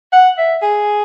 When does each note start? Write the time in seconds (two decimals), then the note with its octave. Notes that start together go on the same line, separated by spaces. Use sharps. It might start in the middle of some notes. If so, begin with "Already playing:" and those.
0.12 F#5
0.38 E5
0.62 G#4